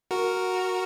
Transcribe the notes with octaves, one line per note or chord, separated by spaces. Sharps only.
F#4 A#4